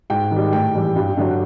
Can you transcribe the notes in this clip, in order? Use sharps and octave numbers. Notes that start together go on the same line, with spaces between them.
G#2 G5
D#3
G3
A2 G5
E3 G3
G2
D3 F#3